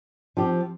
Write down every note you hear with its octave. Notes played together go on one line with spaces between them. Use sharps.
F3 C4 G4